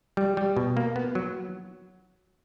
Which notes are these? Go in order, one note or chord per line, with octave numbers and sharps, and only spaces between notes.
G3
G3
B2
A#3
B3
F#3